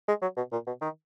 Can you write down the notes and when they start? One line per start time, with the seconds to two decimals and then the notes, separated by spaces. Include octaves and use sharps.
0.08 G#3
0.22 F#3
0.37 B2
0.52 A#2
0.67 B2
0.82 D#3